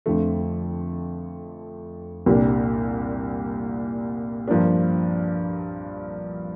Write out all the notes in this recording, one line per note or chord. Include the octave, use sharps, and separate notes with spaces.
F2 D3 F3 A3
C2 A#2 G3 A#3 D4
G2 F3 A#3 D4